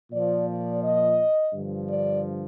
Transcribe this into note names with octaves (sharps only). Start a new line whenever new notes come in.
A#2 F3 D5
D5
D#5
G2 D3 F3
D5